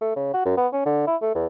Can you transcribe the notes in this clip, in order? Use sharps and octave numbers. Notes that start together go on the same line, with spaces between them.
A3
C#3
F#4
F#2
B3
C#4
D3
E4
A3
E2